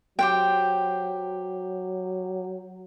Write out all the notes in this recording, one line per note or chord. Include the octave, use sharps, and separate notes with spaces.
F#3 G4 C5 G5